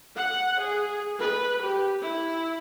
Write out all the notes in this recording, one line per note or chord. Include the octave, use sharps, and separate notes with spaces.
F#5
G#4
B4
G4
E4